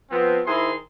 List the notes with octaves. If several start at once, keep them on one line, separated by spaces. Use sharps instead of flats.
F3 B3 C4
D#3 E4 G#4 C5 A#5 C6